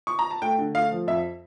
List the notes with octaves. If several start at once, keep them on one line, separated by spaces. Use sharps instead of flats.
C#6
A#5
A5
A3 G5
D3
A3 F5
F3
F2 E5